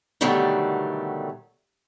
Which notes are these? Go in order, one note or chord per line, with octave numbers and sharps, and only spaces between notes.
B2 D3 D#3 F#3 G3 A3